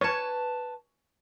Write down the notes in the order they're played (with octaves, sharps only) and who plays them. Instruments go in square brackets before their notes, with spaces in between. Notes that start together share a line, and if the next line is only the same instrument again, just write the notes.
[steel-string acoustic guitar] B4 A5 [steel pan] C#5